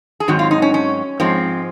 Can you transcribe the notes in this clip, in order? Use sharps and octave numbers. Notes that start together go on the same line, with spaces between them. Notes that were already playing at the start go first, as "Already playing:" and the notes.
G#4
G#2 D#3 F#3 C4 F#4
F4
D#4
C#4
C#4
G#2 F3 G#3 C4